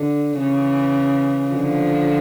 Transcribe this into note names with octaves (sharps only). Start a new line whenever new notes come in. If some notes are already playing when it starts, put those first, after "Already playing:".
Already playing: D3
C#3 E3
D3 F3